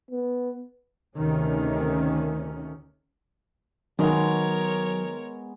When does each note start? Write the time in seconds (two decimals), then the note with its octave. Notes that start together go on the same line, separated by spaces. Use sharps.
0.11 B3
1.16 D2 C3 D#3 A3 C#4
3.99 D#3 F#3 G#3 B3 A#4 C#5